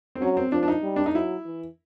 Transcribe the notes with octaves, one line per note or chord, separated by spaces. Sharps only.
C4
F#3 C#4
C4
F3 D4
D4
D#4
G3
D4
D#4
F#3 E4
E3